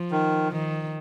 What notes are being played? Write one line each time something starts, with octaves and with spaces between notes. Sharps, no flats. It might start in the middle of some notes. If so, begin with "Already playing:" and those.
Already playing: F3
D#3
D#3